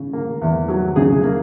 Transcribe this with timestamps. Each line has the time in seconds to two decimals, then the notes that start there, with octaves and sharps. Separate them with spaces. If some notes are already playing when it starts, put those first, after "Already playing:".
Already playing: C#3
0.13 A#3
0.42 E2
0.68 F#3
0.96 C#3 G#4
1.24 A#3